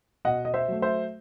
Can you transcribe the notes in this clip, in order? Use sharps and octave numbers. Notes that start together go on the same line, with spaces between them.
B2 D#5 F#5
D#5
C5 E5
F#3 A3
C5 E5